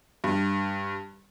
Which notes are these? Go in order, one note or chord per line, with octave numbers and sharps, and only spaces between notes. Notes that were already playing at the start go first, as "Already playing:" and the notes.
G2